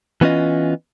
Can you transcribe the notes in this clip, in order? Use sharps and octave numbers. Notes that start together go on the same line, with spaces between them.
E3 B3 C#4 F4 D#5